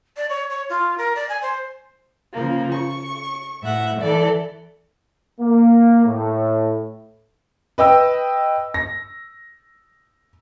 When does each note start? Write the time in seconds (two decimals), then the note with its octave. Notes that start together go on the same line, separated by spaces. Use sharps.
0.17 D5
0.29 C#5
0.50 C#5
0.69 F4
0.98 A#4
1.15 D5
1.29 G#5
1.42 C5
2.35 C#3 F3 A#3
2.75 C#6
3.63 A2 E5 F#5
4.00 E3 A4 D5
5.41 A#3
6.06 A2
7.78 B4 D#5 G5 E6
8.74 A#6